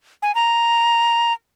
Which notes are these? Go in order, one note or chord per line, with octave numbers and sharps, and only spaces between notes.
G#5
A#5